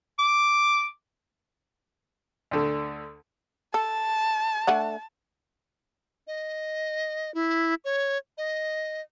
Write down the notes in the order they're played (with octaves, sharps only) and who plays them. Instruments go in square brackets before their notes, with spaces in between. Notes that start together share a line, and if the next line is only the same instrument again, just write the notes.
[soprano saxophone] D6
[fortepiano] D2 D3
[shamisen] A4 [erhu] A5
[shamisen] A3 D4 F#5
[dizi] D#5
E4
C#5
D#5